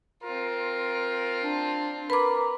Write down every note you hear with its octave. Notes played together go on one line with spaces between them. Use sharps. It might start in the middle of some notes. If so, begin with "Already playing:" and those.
C4 F4 A#4
D4
A#4 B4 B5 D6